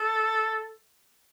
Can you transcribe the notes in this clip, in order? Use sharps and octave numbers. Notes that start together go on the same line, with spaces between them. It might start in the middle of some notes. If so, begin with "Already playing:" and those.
Already playing: A4